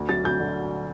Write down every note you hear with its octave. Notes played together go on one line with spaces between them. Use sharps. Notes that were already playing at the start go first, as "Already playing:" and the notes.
Already playing: D2
F#3 A6
D2 G6
D3